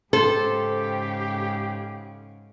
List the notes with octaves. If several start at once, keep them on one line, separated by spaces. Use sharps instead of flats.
G#2 C#3 G4 A4 C5